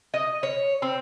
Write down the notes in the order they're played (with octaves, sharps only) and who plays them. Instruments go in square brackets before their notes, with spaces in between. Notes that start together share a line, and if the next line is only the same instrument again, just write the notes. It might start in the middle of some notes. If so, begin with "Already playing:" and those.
[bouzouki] D#5
C#5
C4